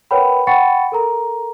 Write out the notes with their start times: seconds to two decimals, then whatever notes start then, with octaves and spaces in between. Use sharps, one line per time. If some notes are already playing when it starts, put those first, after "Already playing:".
0.11 A#4 B4 C#5 F#5 G5 B5
0.47 F#5 G5 B5 C#6 A6 C#7
0.92 A4 A#4 A#5